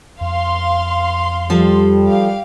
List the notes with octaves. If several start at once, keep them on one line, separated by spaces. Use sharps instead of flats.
F2 F5 C6
F3 G3 A4
G4 F5